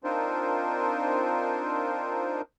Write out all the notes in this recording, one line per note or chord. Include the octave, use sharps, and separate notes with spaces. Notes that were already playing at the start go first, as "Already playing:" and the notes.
C4 D4 D#4 F4 A#4 C5